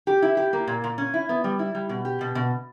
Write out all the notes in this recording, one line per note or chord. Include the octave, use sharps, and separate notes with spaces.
G4
E4
G4
A#3
A#2
A#2
C#4
E4
B3
G3
E4
G3
B2
G4
B2
B2